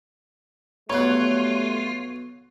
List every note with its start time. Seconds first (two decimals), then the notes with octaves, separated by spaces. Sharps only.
0.90 B1 F#3 G3 A3 F4 C#5 F#6